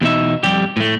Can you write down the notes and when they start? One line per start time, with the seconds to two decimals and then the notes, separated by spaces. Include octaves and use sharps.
0.01 E2 B2 D#4 E5
0.43 F2 G3 G4
0.77 A2 A3